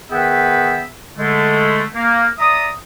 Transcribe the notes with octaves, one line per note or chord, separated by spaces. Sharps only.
D#3 B3 G#4 B4 E5 G5
D3 G#3 A3
A#3
D5 E5 A#5 D#6